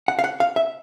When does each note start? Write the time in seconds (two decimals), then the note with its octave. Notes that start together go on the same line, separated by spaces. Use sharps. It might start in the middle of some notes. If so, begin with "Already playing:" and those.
0.08 F#5
0.19 F5
0.24 F#5
0.40 F5
0.56 E5